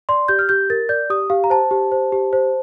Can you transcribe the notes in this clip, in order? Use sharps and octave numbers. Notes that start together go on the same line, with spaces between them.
D5 C6
G4 G6
F6
G4 G6
A#4 A6
D5 G6
G4 D#6
G4 F5
A#5
C5 A5
G4
C5
G4
C5